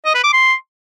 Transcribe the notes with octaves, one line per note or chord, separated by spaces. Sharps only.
D#5
B4
D6
C6